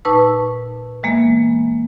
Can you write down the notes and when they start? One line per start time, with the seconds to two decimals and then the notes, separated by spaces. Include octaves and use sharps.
0.05 A#2 D#4 B4 A5 C#6 E6
1.03 E3 G#3 A#3 B3